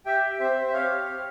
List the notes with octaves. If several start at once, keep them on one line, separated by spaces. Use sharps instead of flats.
G4 E5 G5
G4
C4 C5 E5
C4
E5
G4 C#5 F5
G4
C4